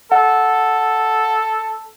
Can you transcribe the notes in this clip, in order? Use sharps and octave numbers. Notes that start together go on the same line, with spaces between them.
A4 F#5